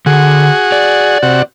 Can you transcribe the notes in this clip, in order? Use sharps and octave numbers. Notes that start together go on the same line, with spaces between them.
D3 F#4 G#4
D5
C3 F#4